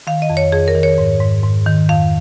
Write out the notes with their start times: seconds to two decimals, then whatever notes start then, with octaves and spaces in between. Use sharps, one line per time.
0.07 D#3 F5
0.22 D#5
0.30 F2
0.37 C#5
0.52 F2 G#4
0.68 A#4
0.75 D#3
0.83 C#5
0.98 G#2
1.21 G#2
1.43 G#2
1.66 D#3
1.89 F2 F5